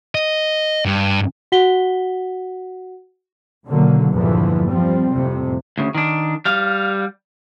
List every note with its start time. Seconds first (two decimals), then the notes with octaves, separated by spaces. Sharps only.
0.15 D#5
0.85 G2
1.52 F#4 F#5 B6 G7
3.66 B2 D3 D#3 F#3 A#3
4.15 E2 G2 A#2 D3 E3 F3
4.71 F3 G3 C4
5.14 F2 A2 C3
5.78 D2 C#3
5.95 D#3 D4
6.45 G3 F5